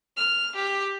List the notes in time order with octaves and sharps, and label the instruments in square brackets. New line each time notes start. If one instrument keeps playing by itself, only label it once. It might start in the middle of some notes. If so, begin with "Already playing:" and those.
[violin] F6
G4